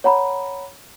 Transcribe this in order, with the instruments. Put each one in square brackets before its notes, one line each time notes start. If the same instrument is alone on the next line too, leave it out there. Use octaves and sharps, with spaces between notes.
[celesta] C#5 F#5 A#5 B5